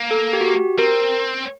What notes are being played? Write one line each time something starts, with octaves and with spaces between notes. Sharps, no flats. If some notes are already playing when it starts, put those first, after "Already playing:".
Already playing: A#3
A4
G4
F#4
G4
C4 A#4